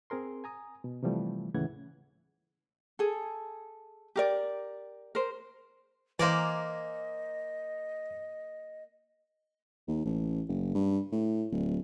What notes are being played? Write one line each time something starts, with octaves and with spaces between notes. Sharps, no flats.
C4 G#4 A#4 C6
G#5 A#5 D#6
B2
C3 E3 F3 G3 A3
D#2 A2 C#3 E3 F#5 G#6
G#4 A4
G4 A#4 D5
A#4 C5
E3 A#3 A#4 C5 D5 D#5 G#5
D#2
A1
F#1
G2
A2
D1